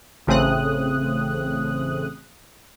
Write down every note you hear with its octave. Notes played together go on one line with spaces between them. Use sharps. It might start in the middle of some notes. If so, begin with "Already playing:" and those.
A1 C#3 A3 C4 D#6 F#6